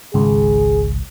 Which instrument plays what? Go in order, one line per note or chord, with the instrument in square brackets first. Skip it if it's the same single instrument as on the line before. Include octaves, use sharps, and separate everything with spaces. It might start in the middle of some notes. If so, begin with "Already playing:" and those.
[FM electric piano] G#1 C#2 [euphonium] G#4